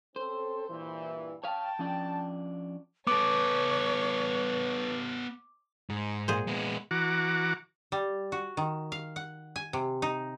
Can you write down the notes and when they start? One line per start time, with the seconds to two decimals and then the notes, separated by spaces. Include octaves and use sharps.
0.16 C4 C#4 A4 C5
0.69 G2 A#2 E3
1.44 C#5 F5 G5 A5
1.79 F3 C#4 D4
3.07 B3 A4 B4 C#5 D6
5.90 G#2
6.28 A#2 G#4 C5
6.47 G#3 B3
6.91 E3 F#4 F#5 A#5 D6
7.92 G3
8.32 F#4
8.57 D#3
8.92 F5
9.16 F#5
9.56 G#5
9.73 C3
10.02 D#4